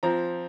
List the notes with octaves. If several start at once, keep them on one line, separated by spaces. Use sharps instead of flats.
F3 C4 A#5